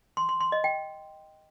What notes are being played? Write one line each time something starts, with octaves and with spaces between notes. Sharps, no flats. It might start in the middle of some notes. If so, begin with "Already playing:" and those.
C6
C6
C6
D#5
G5